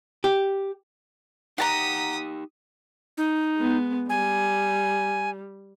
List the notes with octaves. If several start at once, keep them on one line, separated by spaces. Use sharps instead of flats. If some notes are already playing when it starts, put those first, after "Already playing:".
G4
D#4 G4 F#5 G5 A5 A#5 D#6 B6
D#4
G#3 B3
G3 G#5